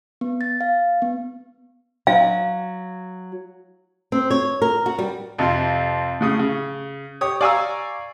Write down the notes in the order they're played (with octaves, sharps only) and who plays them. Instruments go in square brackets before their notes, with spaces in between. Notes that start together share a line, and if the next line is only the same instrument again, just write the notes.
[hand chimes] B3
A6
F5
B3
[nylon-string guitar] F#3 [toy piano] F5
[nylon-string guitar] C4
C#5
A#4
F#4
G3
[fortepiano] F2 C3 F4 F5
A2 C#3 D#6
C#3
G4 C#5 D#6
D5 F5 G#5 A#5 C#6 E6